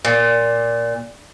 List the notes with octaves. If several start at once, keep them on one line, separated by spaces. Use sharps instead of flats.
A#2